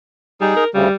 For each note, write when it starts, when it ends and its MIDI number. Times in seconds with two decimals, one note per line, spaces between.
0.41 0.56 55
0.41 0.64 63
0.41 0.64 68
0.56 0.69 70
0.75 0.88 38
0.75 0.88 49
0.75 0.95 55